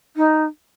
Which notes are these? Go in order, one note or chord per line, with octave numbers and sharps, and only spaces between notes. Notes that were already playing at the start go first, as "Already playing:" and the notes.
D#4